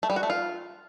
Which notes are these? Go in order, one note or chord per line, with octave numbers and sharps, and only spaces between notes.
A3
G3
F#4
A3
F4